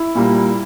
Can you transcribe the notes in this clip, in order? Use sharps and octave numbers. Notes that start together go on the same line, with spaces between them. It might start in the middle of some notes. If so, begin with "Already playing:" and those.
Already playing: E4
A#2 G3 A#3